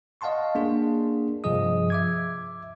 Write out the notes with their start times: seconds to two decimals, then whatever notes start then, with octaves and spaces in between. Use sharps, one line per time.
0.21 D#5 F5 F#5 A5 C6 C#6
0.55 A#3 D4 G#4
1.44 G2 C3 F3 G#4 D#5 D#6
1.90 E5 D6 G#6